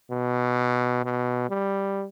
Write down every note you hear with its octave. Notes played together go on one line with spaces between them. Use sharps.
B2
B2
G3